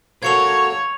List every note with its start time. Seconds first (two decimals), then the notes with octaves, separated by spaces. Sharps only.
0.23 A#3 F#4 A4 C#5 G#6 C#7 F7